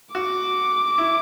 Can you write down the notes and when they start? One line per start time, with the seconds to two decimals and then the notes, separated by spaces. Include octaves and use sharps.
0.15 F#4 D6
0.98 E4